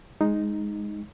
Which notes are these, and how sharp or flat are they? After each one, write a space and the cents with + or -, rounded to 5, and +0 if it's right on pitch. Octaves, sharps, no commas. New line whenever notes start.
G#3 +0 D#4 +0